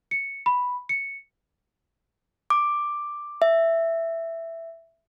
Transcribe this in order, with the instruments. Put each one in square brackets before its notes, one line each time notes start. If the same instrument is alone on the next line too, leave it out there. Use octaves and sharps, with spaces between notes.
[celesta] C#7
B5
C#7
[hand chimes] D6
E5